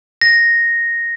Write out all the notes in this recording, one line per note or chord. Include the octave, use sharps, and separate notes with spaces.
A#6